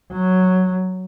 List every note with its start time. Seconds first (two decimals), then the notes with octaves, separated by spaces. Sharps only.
0.12 F#3